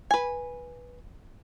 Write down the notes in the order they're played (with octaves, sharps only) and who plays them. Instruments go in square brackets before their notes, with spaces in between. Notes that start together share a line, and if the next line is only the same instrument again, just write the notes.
[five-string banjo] B4 G#5